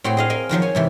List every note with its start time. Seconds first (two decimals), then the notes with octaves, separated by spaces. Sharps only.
0.04 A2 C4 F#4 G#4 F#5 G5
0.17 G#4 D#5 F5
0.30 A#4 D#5 G#5
0.49 F2 D#3 F3 F#3
0.62 C#5 G#5
0.75 G#2 C3 E3